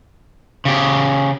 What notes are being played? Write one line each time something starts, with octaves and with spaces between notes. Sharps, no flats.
C#3 G4